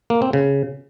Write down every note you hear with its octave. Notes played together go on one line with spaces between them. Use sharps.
A#3
C4
C#3